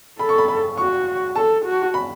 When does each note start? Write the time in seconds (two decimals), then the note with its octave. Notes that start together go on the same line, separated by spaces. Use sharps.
0.19 A4 B5
0.29 C#6
0.38 B5
0.48 B5
0.78 F#4 C#6
1.36 A4 A5
1.65 F#4
1.94 B5